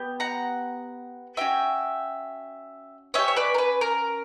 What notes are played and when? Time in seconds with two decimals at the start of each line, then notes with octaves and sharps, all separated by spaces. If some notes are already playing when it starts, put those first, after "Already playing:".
Already playing: B3 G4
0.20 F#5 A#5
1.37 C#4 F#4 E5 G5
3.14 C#4 G4 C#5 E5
3.28 C#5
3.36 B4 D5
3.54 A#4
3.58 B4
3.81 A#4